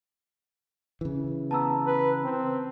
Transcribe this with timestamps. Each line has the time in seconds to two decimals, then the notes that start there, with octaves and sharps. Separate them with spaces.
1.01 C#3 E3
1.51 B3 A5 A#5 E6
1.86 B4
2.24 C4